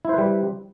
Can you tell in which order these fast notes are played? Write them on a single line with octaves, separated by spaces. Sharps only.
E4 C5 B4 G3